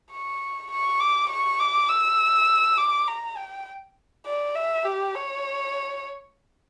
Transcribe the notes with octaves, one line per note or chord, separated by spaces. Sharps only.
C#6
C#6
D6
C#6
D6
E6
D6
A#5
G5
D5
E5
G4
C#5